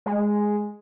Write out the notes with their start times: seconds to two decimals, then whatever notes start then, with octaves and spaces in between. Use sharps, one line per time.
0.06 G#3